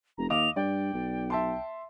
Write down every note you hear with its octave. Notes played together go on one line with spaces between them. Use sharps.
F1 A#5
D#2 D#5 F5 D6 F7
G2 D5 G5
B1
E5 A5 C6